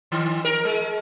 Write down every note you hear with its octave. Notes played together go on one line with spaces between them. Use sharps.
D#3
A#4
G#3